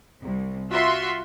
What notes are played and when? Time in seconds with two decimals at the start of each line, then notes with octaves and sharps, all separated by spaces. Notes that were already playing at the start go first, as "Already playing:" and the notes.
0.22 C2
0.70 F4 F#4 E5 C6